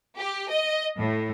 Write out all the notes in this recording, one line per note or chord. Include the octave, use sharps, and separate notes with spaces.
G4
D#5
A2